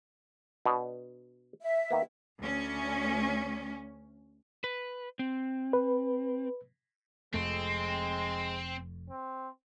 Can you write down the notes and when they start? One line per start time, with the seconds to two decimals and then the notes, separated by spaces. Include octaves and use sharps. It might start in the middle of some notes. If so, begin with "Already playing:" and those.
0.65 B2 D4
1.62 E5
1.91 D#3 A#3 B3
2.40 D2 C#4
4.64 B4
5.19 C4
5.73 B4
7.34 F1 F2 G#3 A3 C4
9.10 C4